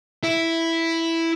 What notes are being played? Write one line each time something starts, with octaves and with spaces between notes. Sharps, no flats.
E4